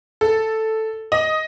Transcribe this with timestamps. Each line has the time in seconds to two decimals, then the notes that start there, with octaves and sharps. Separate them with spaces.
0.21 A4
1.12 D#5